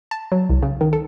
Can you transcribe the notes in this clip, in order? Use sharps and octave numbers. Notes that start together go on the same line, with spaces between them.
A5
F#3
C2
C#3
D#3
A4